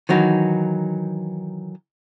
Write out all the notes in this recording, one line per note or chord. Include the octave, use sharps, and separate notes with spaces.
D#3 E3 F#3 D#4